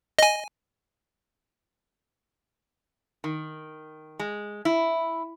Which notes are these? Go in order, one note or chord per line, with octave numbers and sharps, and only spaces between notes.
D#5 G#5
D#3
G#3
E4